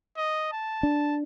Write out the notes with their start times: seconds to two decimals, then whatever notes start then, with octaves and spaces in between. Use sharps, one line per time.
0.18 D#5
0.53 A5
0.83 D4